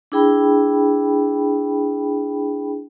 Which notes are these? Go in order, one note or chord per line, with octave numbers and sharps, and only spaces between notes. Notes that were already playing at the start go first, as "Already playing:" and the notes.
D4 E4 G#4 G5 B5